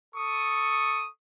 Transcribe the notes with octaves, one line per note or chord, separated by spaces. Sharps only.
A4 C#6 D#6